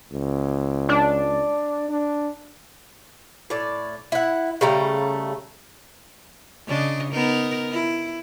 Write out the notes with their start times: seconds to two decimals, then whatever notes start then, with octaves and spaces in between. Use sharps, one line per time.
0.12 C#2
0.89 D4
1.89 D4
3.50 A2 D5
4.12 E4 F#5
4.61 C#3 G3 A3 A#5
6.67 C#3 D4 D#5
7.12 B3 D#4 A#4
7.71 E4